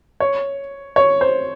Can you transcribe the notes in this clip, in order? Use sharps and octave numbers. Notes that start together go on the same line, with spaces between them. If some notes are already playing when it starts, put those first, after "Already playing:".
C#5
C#5
C5